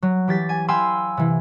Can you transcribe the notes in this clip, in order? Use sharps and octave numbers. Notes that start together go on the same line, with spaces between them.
F#3
E3 G4 A6 B6
G#5
F5 G5 G#5 B5 C6 E6
C3 E3